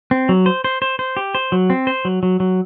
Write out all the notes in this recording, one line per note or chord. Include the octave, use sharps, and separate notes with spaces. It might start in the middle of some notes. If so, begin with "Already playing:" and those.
C4
F#3
C5
C5
C5
C5
G4
C5
F#3
C4
C5
F#3
F#3
F#3